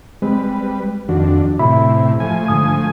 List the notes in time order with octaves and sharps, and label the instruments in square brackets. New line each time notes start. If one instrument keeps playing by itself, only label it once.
[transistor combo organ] G3 B4 [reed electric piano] G#3 C4
[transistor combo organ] F2 D4 [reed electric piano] D#3 F#4
[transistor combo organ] A2 C3 E4 [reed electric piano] E5 B5
[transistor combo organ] F3 A3 G#5
[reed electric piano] G#2 D3 D#6